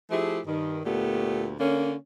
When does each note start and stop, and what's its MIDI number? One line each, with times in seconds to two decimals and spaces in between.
0.10 0.40 53
0.10 0.40 57
0.10 0.40 64
0.10 0.40 67
0.10 0.40 68
0.46 0.79 43
0.46 0.79 51
0.85 1.53 38
0.85 1.53 46
0.85 1.53 57
0.85 1.53 59
0.85 1.53 67
1.60 1.94 50
1.60 1.94 58
1.60 1.94 61